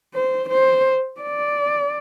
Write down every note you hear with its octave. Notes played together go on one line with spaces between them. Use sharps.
C5
C5
D5